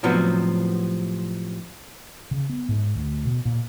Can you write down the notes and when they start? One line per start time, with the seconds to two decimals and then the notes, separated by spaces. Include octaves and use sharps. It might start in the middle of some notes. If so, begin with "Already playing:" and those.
0.03 A2 C3 F3 F#3 B3
2.31 C#3
2.49 B3
2.69 G#2
2.95 D2
3.25 B2
3.45 A#2